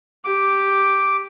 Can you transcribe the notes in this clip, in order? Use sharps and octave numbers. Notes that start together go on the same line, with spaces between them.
G4 D6